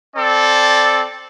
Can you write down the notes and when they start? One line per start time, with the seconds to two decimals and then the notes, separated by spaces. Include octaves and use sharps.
0.16 C4 A4 D5